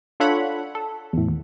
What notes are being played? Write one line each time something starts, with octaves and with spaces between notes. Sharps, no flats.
D4 F4 A4 C#5 F#5 B5
A4
E2 A2
D#2